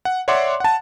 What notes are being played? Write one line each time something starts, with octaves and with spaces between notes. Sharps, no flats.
F#5
C#5 D5 E5 F#5 C6 D6
F#5 A5